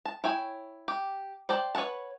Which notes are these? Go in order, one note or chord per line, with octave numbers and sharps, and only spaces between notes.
A5
E4 C#5 G5 G#5
G4
C5 D5 G5 A5
B4 C#5 E5 F#5 A5